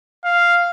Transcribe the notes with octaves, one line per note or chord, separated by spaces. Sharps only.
F5